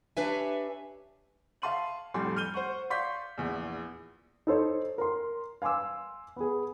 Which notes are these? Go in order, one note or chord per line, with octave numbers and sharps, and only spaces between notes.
D4 G4 B4 C#5 E5 G#5
E5 F5 A5 C6 D#7 F#7
F1 F2 A2 G3 G#5 C6
F6 G6 D#7 G7
C5 F#5 C#6
D5 F5 C6 C#6 G6 B6
A#1 E2
D#4 A4 C5 C#5
A#4 C6
F5 G#5 C6 D6 E6
B3 G#4